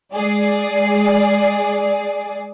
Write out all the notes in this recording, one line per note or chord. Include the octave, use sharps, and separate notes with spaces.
G#3 G#4 D5